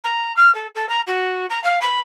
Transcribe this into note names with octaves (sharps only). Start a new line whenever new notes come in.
A#5
F6
A4
A4
A#5
F#4
A#5
F5
B5